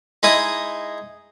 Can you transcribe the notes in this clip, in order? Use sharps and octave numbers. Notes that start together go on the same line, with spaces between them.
G#3 D#4 E4 G#4 D#6